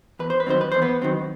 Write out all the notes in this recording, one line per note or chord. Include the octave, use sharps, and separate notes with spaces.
E2 B4
C5
B4
D#3 F#3 C4 C5
B4
E2 C5
B3 B4
D#3 F#3 C4